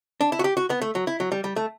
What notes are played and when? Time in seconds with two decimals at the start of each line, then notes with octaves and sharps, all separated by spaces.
0.21 D4
0.32 E4
0.39 F#4
0.44 G4
0.57 F#4
0.70 B3
0.82 A3
0.95 F#3
1.07 E4
1.20 F#3
1.32 G3
1.44 G3
1.56 A3